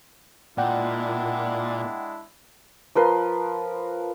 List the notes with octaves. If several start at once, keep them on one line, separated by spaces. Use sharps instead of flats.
A#2 G#3 D4 E4 D5 F#5 G5
F3 A#4 B4 C6